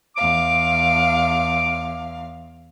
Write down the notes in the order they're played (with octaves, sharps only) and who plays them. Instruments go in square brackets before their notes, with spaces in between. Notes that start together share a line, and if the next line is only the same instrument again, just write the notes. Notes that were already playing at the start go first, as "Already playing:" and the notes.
[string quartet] E2 F5 [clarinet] D6